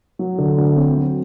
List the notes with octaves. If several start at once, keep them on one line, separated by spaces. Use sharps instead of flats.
F#3
D3
D2
C4
F#3